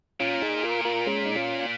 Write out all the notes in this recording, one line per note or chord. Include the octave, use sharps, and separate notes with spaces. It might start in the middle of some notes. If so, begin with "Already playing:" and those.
A#2 C#4 F4
D#4 G#4
F4 A#4
F4 A#4
G#3 C#4
D#4
C#4 F4